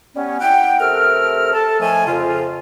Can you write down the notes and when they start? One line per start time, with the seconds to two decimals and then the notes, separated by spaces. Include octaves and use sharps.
0.16 G3 B3 C#4
0.41 E4 F#5 G5
0.80 C3 A3 A4 A#4 F6
1.53 A4 A5
1.81 A2 D#3 F3 A3 G#5
2.08 F2 C#3 F4